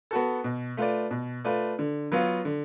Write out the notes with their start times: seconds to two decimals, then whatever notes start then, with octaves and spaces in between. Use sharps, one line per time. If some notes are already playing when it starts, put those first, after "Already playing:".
0.11 B3 F#4 A4
0.44 B2
0.77 A3 F4 B4 D5
1.11 B2
1.44 A3 F4 B4 D5
1.79 D3
2.12 F#3 B3 F4
2.45 D3